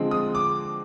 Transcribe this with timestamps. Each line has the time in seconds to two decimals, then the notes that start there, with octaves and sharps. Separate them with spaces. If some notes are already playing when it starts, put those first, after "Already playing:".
Already playing: D3 F3 G#3 C4
0.11 D#6
0.35 D6